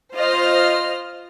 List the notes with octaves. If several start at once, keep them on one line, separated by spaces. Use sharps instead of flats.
F4 C5 D#5 F6